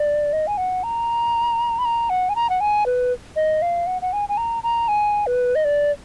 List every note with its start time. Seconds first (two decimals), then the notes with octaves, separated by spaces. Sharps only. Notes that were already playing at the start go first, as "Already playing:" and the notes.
Already playing: D5
0.33 D#5
0.47 G#5
0.58 F#5
0.83 A#5
1.79 B5
1.85 A#5
2.10 F#5
2.29 G#5
2.36 A#5
2.50 F#5
2.60 G#5
2.86 B4
3.36 D#5
3.62 F5
3.87 F#5
4.02 F#5
4.13 G#5
4.29 G#5
4.37 A#5
4.63 A#5
4.88 G#5
5.27 B4
5.55 D#5
5.65 D5